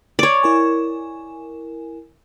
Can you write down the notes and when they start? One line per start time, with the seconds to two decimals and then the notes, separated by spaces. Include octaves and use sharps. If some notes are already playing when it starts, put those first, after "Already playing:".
0.19 C#5 D5
0.43 E4 A#4 G#5